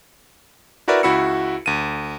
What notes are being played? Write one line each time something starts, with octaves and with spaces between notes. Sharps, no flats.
E4 F#4 A#4 B4 D5 E5
C#2 E4 F#4 B5 E6 C#7
D2 D#7